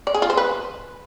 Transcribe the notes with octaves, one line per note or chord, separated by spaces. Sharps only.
D5
G#4
F4
C5
B4